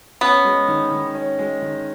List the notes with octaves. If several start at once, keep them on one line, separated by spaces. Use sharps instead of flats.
B3 C#4
G#3
D#3
D#3
C#4
G#3
D#3